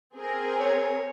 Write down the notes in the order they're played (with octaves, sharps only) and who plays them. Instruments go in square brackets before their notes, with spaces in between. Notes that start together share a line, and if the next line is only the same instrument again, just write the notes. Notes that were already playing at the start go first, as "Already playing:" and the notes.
[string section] C4 G#4 A#4
[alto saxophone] C#5